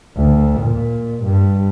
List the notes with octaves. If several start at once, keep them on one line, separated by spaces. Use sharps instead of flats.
D2
A#2
G2